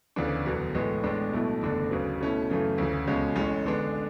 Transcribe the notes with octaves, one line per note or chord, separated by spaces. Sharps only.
D2 C#3 E3 B3 D4
E1 E2 D3 F#3 B3
B1 A2 E3 G#3 B3
A1 A2 G#3 B3 D4
B1 B2 A3 E4
F#1 E2 D3 A3 D4
D2 C#3 F#3 B3
B2 A3 C#4 E4
F#2 C#3 E3 A3
D2 C#3 E3
C#2 B2 G#3 C#4
A1 A2 G#3 C#4
D3 G#3 B3 D4